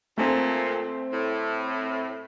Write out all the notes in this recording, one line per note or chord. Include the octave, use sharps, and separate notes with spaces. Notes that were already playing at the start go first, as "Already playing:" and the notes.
F2 A#2 A3 C4
A2